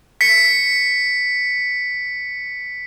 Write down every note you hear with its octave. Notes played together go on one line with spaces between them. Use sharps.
B6 C#7